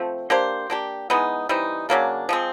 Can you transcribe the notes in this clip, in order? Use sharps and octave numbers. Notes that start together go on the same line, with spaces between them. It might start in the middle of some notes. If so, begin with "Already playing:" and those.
Already playing: F3 A3 C4
A#3 D4 G4 C5
A#3 D4 G4
E3 G#3 B3 D#4
E3 G3 C4 D#4
C#3 F#3 A#3 D4
F3 G#3 C4